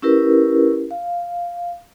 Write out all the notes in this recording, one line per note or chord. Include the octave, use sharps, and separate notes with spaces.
C#4 E4 G4 A#4 B4
F5